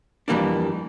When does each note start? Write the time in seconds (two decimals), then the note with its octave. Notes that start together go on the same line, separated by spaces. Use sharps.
0.28 F2 E3 G3 A#3 D4